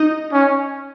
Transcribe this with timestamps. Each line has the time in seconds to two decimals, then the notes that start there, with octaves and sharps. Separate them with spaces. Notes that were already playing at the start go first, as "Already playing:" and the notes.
Already playing: D#4 D#5
0.32 C#4